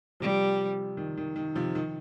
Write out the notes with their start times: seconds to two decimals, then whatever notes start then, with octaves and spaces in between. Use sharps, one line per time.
0.20 C3 F3 G3
0.97 D#3
1.17 D#3
1.36 D#3
1.55 C3 F3
1.75 D#3